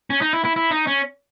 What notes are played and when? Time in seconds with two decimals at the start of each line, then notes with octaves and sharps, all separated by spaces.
0.10 C#4
0.21 D#4
0.33 E4
0.45 E4
0.56 E4
0.71 D#4
0.87 C#4